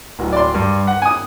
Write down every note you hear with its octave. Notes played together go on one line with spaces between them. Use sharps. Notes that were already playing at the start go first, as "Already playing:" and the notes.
D1 F#3
D5 C6
G2
F#5
G#5 D#6